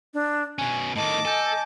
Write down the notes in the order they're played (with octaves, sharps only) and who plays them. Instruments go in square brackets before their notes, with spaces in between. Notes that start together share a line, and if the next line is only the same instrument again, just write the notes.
[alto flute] D4
[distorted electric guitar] B2 C#4 [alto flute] G#5
[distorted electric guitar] A2 D#3 [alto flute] D#5 [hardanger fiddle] A5 D6
[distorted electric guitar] A4 [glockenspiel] G#5 G6